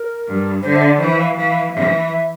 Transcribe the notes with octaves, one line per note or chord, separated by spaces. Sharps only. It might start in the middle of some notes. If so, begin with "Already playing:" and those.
Already playing: A#4
G2
D3 C5
E5
D5
E3 C5
F5
E3 F5
E3 E5
E5